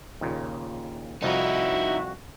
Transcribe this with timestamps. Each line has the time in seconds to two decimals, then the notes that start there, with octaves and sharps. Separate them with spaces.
0.21 D#2 A#2 C#3
1.22 C2 F2 D#4 E4 F#4